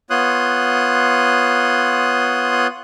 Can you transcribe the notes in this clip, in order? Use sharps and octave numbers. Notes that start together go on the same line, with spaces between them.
B3 F4 C#5 C6 D#6 F#6